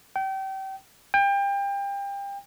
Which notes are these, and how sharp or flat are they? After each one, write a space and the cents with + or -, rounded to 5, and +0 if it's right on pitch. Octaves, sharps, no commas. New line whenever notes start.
G5 -30
G5 +30